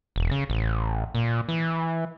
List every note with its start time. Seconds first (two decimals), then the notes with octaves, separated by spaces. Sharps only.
0.16 E1
0.31 C#3
0.50 A1
1.15 A#2
1.49 E3